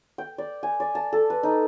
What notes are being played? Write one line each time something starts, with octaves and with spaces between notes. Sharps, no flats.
G5
D5
G#5
D5
A5
A4
B4
D#4